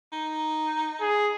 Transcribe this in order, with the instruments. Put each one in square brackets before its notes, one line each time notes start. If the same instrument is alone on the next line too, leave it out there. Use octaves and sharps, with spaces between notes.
[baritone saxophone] D#4
[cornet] G#4